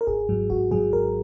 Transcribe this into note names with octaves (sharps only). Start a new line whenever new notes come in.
A#4
G#1 G#4
G#2 F#3
G#1 F#4
G#2 F#3 G#4
G#1 A#4